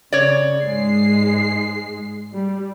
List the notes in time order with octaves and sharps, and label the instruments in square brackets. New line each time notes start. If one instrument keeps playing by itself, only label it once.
[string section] C#3 [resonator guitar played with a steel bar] C#5 D5
[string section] G#2 G#3 C7
G3